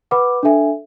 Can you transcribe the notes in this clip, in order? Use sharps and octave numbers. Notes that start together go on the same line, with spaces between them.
B4 F#5 B5 D6
D4 A4 E5 G#5